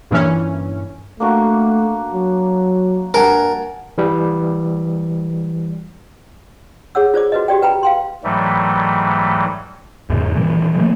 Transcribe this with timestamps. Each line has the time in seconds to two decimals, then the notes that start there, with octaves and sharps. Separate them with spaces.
0.11 G2 A#2 E3 C#4
1.20 A3 A#3 D4 F#4
2.14 F#3
3.14 G2 A#4 F#5 G#5 A5
3.98 E3 G3
6.95 G#4 C#5 F#5 E6
7.14 F4 C5 D5 D6
7.32 F#4 B4 D#5
7.48 F#4 G4 D5 G5
7.62 B4 G5 A#5 B5
7.83 F5 G5 C6
8.24 G#2 E3 F#3 G3 A3
10.10 E2 G#2 C#3
10.37 A#2 D#3 E3 G3
10.76 D#3 F3 A3 A#3